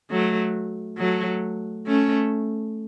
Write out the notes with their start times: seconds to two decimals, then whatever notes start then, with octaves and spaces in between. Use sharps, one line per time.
0.10 F#3 A3
0.98 F#3 A3
1.87 A3 C#4